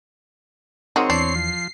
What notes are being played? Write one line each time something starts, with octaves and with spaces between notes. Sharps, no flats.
D#3 G#3 C4 F#4 C#5
E2 E3 D4 C7
F3